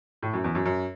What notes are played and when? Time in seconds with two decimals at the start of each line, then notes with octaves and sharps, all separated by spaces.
0.23 A2
0.33 F#2
0.44 E2
0.55 F#2
0.66 F#2